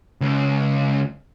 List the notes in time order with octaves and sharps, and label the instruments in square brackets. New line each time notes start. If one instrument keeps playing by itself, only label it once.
[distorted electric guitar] C#2 C#3